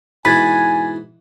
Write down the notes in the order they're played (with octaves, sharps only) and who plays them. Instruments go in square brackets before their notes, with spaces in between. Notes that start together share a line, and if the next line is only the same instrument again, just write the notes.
[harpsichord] G#2 B2 E3 [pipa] B4 [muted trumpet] G#5 [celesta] G#6 A6 B6